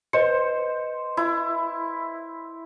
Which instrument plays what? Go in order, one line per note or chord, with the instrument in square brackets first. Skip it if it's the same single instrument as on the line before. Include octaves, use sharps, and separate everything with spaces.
[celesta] B4 D#5 C#7 [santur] C5
[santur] E4